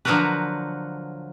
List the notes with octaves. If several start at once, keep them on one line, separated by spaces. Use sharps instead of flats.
D3 F3 F#3 F#4 A#4 B4